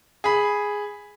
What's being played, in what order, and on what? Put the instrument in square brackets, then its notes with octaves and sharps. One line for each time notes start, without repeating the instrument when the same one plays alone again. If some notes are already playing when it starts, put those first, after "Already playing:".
[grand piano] G#4 B5